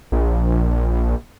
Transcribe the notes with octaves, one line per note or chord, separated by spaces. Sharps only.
A#1